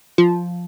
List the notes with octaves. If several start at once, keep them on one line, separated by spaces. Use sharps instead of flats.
F3